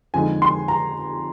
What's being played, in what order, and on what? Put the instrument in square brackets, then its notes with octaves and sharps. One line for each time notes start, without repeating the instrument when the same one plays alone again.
[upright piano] F2 D3 F3 G#3 D#4 G#5
C6
A#5